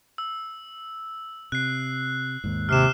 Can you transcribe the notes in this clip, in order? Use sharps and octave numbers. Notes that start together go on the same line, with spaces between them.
E6
C3 F#6 C7
D#2 G#2
C3 F6 C7 E7